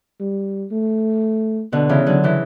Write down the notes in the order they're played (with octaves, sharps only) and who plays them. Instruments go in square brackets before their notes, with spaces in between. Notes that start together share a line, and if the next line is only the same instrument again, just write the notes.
[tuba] G3
A3
[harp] B2 D3 [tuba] B3
[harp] C#3 E3
D3 F#3
C#3 E3